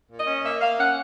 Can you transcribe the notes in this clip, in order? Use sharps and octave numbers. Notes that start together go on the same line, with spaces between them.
A#2
D#5
C#4
A#3 E5
A#3 F5
C#4 F#5